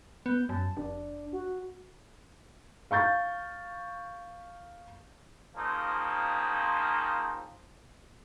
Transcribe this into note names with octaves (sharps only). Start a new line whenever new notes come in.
B3 G6
F#2 A5
F1 D4
F#4
F5 C#6 G6 A6
C#3 F3 A#3 C4 D#4